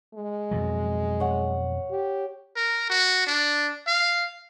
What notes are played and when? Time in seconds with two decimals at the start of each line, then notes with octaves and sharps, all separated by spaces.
0.15 G#3
0.51 F2 B2 F#3
1.20 C#5 F#5
1.91 G4
2.56 A#4
2.89 F#4
3.27 D4
3.87 F5